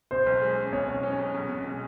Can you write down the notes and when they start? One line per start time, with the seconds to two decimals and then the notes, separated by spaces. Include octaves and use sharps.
0.11 B2 C5
0.26 B1
0.42 G#3
0.57 C#4
0.73 B2 C#5
0.88 B1
1.03 C#4
1.19 B1
1.34 B2
1.49 B2
1.65 G#3